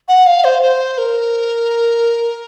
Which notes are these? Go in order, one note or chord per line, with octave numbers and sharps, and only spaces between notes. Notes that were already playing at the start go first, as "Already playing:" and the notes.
F#5
F5
C5
C5
A#4